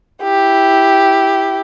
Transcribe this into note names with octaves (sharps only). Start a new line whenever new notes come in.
E4 G4